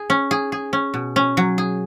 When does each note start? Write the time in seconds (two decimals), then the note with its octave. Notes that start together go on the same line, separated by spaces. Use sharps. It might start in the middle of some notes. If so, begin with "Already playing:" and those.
Already playing: G#4
0.10 C#4
0.31 G#4
0.52 G#4
0.73 C#4
0.94 B2
1.16 C#4
1.37 F#3
1.58 G#4